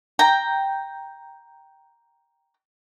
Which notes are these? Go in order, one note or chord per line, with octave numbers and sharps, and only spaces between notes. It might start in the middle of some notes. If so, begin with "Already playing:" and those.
G5 A#5